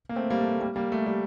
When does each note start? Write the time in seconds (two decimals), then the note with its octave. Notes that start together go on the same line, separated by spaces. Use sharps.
0.09 A#3
0.16 A3 C4
0.30 G3 A#3
0.41 A3
0.52 A3
0.61 G3 A#3
0.76 G3 A#3
0.92 A3
1.06 G3